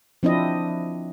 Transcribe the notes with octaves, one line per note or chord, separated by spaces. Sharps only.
F3 C4 D4 E4 D#5